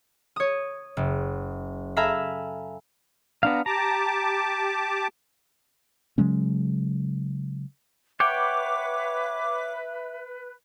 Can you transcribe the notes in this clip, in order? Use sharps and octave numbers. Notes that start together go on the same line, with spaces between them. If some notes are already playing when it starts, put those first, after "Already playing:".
C#5 D#6
F#1
A4 E5 F5 G#5 A#5 B5
B3 D4 F5 A#5
G4 A5 A#5 D6
C#3 F#3 G#3 C#4
B4 C#5 E5 F#5 G5 D6